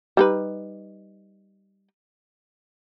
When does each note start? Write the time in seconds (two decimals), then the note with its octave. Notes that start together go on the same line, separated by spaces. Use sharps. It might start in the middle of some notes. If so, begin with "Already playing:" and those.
0.17 G3 D#4 B4